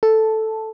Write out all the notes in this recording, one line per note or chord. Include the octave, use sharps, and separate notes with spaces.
A4